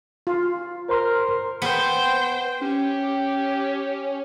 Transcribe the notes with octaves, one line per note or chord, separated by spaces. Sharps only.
F4
A#4 C5 C6 F6
B3 C5 G5
C#4 G4